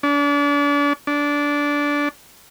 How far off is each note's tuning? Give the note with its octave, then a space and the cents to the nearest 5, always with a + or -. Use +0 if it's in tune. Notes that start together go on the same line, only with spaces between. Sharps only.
D4 -35
D4 -15